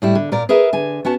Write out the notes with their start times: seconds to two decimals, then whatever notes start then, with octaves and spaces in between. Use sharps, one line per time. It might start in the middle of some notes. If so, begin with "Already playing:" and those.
0.02 A2 G3 E4
0.15 D3
0.32 A#2 A#4 D5
0.49 G#4 A#4 B4 E5
0.73 D3 G#5
1.05 B3 C#4 F#4 A5